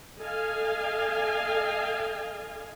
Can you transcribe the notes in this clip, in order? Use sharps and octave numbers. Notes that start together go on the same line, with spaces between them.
A4 D#5 F5 G#5